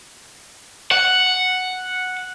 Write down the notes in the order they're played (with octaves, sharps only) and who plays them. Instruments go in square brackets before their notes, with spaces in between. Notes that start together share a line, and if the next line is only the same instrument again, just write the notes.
[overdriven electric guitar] F#5